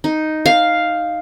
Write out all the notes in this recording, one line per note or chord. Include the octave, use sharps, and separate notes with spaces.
D#4
F5